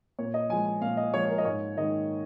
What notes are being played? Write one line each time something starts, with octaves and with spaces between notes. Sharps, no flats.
A#2 C#5
D#5
F3 G#3 G#5
G#5
A#2 F5
D#5
F3 G#3 C#5
C#5
A#4
D#5
G#2 C#5
D#3 G#3 D#5